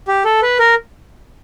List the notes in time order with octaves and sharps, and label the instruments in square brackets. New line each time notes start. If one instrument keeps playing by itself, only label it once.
[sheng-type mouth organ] G4
A4
B4
A#4